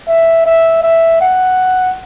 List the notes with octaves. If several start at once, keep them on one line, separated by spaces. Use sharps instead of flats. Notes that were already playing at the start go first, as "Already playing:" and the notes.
E5
E5
E5
F#5